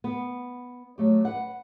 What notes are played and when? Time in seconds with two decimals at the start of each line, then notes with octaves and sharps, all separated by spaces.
0.04 B3
0.98 F#3 A3 G4
1.25 B4 F#5